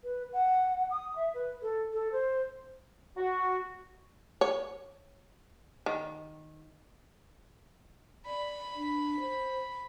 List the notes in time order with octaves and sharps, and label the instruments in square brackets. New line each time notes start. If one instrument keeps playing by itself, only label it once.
[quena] B4
F#5
D#6
E5
B4
A4
A4
C5
[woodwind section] F#4
[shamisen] C#5
D#3
[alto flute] D5 [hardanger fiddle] B5
[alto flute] D4
C5